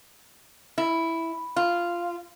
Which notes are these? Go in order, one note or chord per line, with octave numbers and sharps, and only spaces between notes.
E4
F4